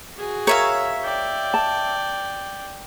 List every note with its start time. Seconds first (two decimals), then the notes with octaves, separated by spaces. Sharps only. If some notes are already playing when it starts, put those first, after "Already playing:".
0.18 F#4 G#4
0.47 A#4 C#5 E5 F5
1.04 D5 G5
1.54 A5